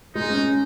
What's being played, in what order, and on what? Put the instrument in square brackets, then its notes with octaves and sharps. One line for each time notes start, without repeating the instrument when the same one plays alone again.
[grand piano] G#3 [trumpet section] D#4
[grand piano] C#4